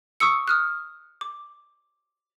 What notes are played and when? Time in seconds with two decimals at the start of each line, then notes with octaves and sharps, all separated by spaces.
0.20 C#6 D#6 E6 C#7
0.48 D#6 F6 F#6
1.21 D6